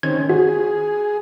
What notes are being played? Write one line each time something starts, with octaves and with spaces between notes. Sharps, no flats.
D#3 C4 C#4 G#6
F#4 G#4